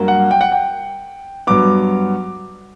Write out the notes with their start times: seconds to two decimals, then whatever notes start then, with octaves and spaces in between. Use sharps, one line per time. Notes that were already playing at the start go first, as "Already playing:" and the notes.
Already playing: G2 F#3 A#3
0.08 F#5
0.31 G5
0.41 F#5
0.52 G5
1.47 G2 F#3 B3 D6